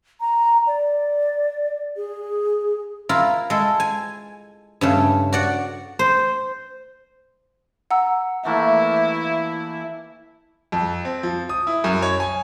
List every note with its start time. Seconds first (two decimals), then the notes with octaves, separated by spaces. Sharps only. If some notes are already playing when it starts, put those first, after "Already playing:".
0.21 A#5
0.67 D5
1.96 G#4
3.09 E4 F4 A#4
3.50 G#3 A4
3.80 G#5
4.81 G2 C#3 A3
5.33 F#4 D5 F#5
5.99 C5
7.91 F#5 A#5 E6
8.45 E3 A3 A#3 E4
10.72 F2
11.05 C4
11.23 F3
11.49 D#6
11.67 E4
11.84 F#2
12.02 C#5
12.20 G#5